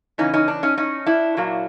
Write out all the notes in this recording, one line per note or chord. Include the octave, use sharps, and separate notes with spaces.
C#3 E3 C#4 D#4
C#4 D#4
D4
C#4 D#4
C#4 D#4
D4 E4
A#2 F#3 A#3